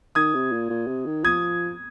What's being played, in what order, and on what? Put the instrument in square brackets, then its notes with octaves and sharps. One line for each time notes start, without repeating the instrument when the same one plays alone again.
[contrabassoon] D#3 [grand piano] D#6 G#6
[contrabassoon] C3
A#2
A#2
C3
D#3
[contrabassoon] F3 [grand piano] D#6 G#6